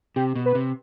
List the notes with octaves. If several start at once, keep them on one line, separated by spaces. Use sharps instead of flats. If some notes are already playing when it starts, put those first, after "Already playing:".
C3 G4
B2
B4
C3